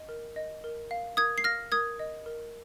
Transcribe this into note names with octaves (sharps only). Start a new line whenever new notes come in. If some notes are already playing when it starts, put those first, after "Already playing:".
Already playing: D#5
A#4
D#5
A#4
F5
A#4 D#6 G#6
C7
F5 F6 A#6
A#4 D#6 G#6
D#5
A#4